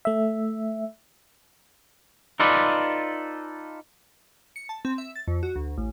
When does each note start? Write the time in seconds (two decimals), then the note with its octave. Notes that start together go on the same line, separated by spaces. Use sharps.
0.05 A3 E5
2.40 D#4 F4 A4 B4 D5
4.56 C#7
4.69 A5
4.85 C4
4.98 E5
5.16 A6
5.28 F2
5.43 F#4
5.56 D2
5.78 A1